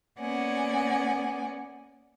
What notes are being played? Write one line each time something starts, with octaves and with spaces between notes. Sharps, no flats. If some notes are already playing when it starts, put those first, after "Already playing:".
A#3 B3 C#4 D5 F#5 G#5